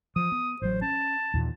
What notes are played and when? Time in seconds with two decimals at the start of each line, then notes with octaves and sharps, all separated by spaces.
0.16 F3 D#6
0.32 B3
0.62 A1 F#3 C5
0.82 C#4 A5
1.34 D#2 A#2 E3